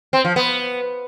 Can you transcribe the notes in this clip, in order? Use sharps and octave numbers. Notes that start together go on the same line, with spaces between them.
C4
F3
B3